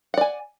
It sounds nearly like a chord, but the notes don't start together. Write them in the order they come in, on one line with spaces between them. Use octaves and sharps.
F#5 D5 G#5